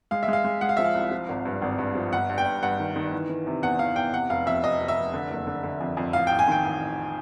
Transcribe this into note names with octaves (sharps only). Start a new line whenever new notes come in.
G#3 F5
E5
G#3
F5
G#3
G#3 F#5
F5
F3 E5
F5
C2
F3
G#1
G2
G#1
G2
F3
G1 F#5
G2
G5
G2
G2 F#5
D#3
D#3
E3
E3
C3
E2 F#5
E3 F5
E2 G5
C3 F#5
F1 F5
F2 E5
C3 D#5
F1
E5
F1
D3
F#1
D3
D3
F2
F2
A1 F5
A1 G5
G#5
D#3 G5
A1
A1